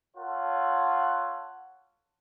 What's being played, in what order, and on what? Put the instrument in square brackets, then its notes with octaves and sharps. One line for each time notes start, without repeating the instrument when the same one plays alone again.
[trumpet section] F4 A4 C#5 F#5